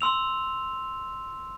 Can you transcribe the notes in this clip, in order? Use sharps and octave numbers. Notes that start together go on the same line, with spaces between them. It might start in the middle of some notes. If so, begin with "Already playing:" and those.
C6 E6 F7